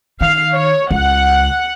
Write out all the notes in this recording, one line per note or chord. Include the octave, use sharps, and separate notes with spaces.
D#3 F5
C#5
C#2 F#5